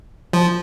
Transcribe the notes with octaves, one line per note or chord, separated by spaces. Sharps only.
F3